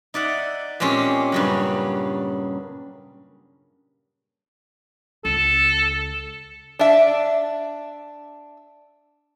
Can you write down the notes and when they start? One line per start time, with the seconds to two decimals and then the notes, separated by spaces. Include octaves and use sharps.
0.14 D#4 D5 E5 F#5
0.80 A#2 G#3 C4 C#4 G4
1.32 G2 C#3 F#3
5.25 C#2 A4
6.79 D4 E5